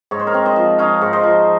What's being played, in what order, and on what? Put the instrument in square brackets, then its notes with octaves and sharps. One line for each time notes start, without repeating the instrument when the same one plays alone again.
[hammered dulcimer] G#2 C#5
C5
A#4 C#5
C4
C5 D#5
F3
D#4 C#5 F5
G#2
C5 D#5
F3